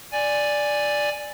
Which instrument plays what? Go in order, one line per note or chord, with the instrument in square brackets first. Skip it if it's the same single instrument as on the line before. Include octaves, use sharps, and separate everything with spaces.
[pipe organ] D5 G#5